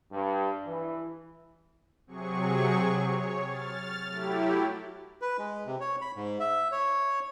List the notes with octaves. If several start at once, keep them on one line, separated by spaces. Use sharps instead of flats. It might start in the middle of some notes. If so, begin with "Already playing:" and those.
G2
E3
C3 F#3 G#4 C#6
C#5
F6 A6
F#3 A3 E4 G4
B4
G#3
C3
C#5
B5
G#2
E5
C#5